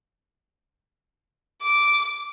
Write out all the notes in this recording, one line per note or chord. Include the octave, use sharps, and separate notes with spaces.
D6